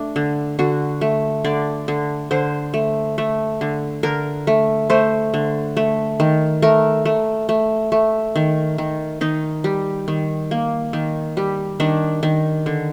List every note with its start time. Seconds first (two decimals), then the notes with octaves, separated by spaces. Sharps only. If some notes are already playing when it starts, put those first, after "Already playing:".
Already playing: A3 D4
0.16 D3
0.59 D3 F#4
1.01 A3
1.44 D3 D5
1.88 D3
2.31 D3 C5
2.74 A3
3.18 A3
3.61 D3
4.03 D3 A#4
4.47 A3
4.90 A3 C5
5.34 D3
5.77 A3
6.20 D#3
6.62 A3 A#4
7.05 A3
7.49 A3
7.92 A3
8.36 D#3
8.78 D#3
9.21 D#3 D#4
9.64 G3
10.08 D#3
10.51 A#3
10.93 D#3
11.37 G3
11.80 D#3 D4
12.23 D#3
12.66 D3